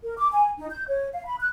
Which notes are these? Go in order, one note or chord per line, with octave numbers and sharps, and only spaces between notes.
A#4
D6
G#5
D#4
G6
C#5
F5
B5
F#6